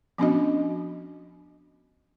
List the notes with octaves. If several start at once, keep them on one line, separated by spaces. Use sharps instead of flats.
F3 B3 C#4 D4 F#4 D#5